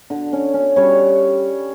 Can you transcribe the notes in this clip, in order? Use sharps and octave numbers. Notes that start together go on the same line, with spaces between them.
D3
C#4
C#4
G3 C#4 C#5